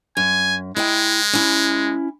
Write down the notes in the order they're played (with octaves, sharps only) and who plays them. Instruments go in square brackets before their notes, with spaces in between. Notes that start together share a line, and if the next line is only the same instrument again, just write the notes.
[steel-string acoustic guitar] F#2 [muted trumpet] G#5
[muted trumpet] G#3 [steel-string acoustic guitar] E4 D#5 G5
[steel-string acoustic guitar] C#4 E4